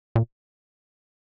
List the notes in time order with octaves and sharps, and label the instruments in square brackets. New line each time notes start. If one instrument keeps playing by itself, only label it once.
[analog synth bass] A#2